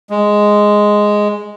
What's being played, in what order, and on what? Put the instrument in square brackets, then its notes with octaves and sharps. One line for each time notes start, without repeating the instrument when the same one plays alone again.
[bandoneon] G#3